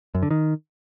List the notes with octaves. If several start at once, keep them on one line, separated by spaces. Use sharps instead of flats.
F#2
D3
D#3